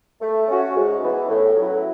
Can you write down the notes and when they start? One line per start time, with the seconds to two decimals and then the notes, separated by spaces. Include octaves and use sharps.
0.21 A3
0.48 C#4 F#4
0.76 G#2
1.03 E3 B3
1.29 A2
1.56 F#3 C#4 E4